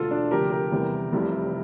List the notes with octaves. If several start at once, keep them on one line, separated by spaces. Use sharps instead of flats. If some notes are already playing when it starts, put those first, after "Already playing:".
Already playing: E1 D2 D3 F4 A4
D4
D2 C3 F3 G4 A#4
G4 A#4
E2 C3 G3
F1 F2 C3 E3 G3